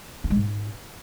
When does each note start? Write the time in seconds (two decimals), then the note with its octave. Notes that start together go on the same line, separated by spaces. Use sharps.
0.24 D4
0.30 G#3
0.36 G#2